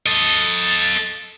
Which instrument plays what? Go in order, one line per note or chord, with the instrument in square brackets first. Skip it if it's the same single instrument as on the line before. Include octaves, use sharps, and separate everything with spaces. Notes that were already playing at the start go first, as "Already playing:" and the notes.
[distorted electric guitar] A4 D#5